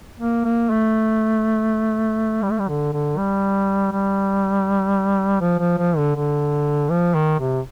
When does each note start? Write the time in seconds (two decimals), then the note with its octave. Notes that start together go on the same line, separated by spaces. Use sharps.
0.20 A#3
0.45 A#3
0.70 A3
2.42 G3
2.51 A3
2.59 G3
2.68 D3
2.93 D3
3.17 G3
3.92 G3
5.41 F3
5.59 F3
5.78 F3
5.97 D3
6.15 D3
6.89 F3
7.14 D#3
7.39 C3